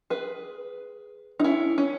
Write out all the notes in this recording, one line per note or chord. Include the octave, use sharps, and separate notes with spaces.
G#4 B4
D#4
C#4 E4
C#4